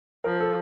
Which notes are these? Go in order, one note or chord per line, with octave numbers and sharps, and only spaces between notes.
F3 A#4
A4